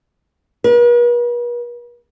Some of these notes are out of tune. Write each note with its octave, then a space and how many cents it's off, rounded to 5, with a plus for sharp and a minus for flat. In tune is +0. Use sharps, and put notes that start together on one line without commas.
B4 -45